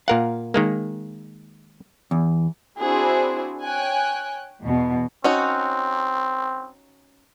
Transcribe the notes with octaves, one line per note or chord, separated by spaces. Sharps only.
A#2 A#4 F5 F#5
D#3 G#3 A#3
E2
C4 D4 E4 F#4 G#4 C5
C#5 G5 G#5 F#6
E2 B2
C4 C#4 D#4 F#4